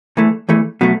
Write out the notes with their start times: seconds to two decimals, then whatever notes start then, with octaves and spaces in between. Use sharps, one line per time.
0.17 E2 E3 A3
0.49 E2 E3 A3
0.81 B2 F#3 A3